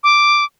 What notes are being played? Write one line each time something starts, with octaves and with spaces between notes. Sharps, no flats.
D6